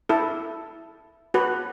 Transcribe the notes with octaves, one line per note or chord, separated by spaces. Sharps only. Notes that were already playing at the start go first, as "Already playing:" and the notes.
E4 A4
F#4 B4